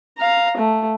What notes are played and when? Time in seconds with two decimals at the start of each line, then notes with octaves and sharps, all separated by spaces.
0.18 F5 A#5
0.57 A3